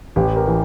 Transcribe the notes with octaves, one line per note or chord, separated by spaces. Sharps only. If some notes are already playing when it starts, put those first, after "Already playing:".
A1 G4
A#4
E3